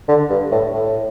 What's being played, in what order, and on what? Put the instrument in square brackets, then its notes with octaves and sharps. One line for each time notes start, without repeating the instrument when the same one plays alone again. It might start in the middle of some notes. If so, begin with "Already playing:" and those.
[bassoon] D3
G2
A2
A2